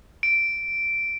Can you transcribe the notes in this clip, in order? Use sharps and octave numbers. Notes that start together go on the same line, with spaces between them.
D7